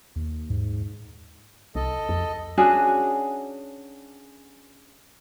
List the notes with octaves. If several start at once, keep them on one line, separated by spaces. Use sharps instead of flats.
D#2
G#2
C2 A4 D#5
F2
C#4 D4 F#4 G#4